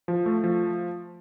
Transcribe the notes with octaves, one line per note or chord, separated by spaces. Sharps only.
F3
A3
F3